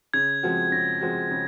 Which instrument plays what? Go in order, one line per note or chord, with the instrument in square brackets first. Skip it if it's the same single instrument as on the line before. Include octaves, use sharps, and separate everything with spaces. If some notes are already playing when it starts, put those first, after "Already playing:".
[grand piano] C#3 [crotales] G#6
[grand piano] F3 G#3 C4 F#4
[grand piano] C#3 [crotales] A#6
[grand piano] F3 G#3 C4 F#4
C#3